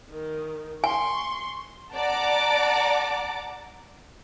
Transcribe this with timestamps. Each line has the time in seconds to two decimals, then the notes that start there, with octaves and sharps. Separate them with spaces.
0.11 D#3
0.84 G#5 C6 C#6
1.94 D5 F#5 A5 A#5 D6